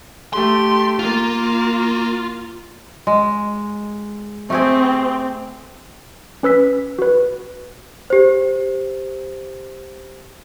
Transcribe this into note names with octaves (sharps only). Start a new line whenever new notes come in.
A3 G4 C6
A#3 F4
G#3
A3 C4 G4 G#4
C#4 B4 E6 B6
F#4 B4
G4 C5